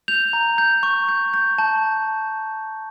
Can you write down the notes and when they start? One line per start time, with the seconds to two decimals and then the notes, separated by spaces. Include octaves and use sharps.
0.08 G6 F7
0.33 A#5
0.58 G6
0.83 C#6
1.09 G6
1.34 G6
1.58 A5 G6